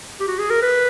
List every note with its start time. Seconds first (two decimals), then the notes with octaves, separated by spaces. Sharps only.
0.20 G4
0.28 F#4
0.39 G#4
0.50 A#4
0.62 B4